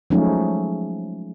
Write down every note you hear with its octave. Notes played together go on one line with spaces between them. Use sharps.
F3 F#3 G#3 A3 C#4 D#4